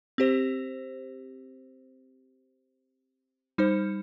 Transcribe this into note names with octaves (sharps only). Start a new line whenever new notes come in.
C4 G4 C5
G3 D#4 C5